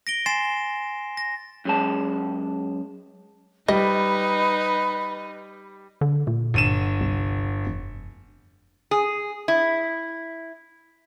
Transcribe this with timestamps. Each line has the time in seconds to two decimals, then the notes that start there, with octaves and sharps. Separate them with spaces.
0.07 A#6 D7 G7
0.26 G#5 C6 A6 C7 E7
1.17 A#6
1.65 F#2 G#3 A5
3.68 F3 G3 D#4 B4 D#5 B5
6.01 D3
6.27 A#2
6.54 G1 D#7 E7
7.00 C2
7.66 F1
8.91 G#4
9.48 E4